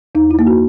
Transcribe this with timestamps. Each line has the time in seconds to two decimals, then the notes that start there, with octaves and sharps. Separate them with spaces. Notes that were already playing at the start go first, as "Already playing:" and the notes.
0.15 E2 D#4
0.31 E4
0.39 A#3
0.47 F#4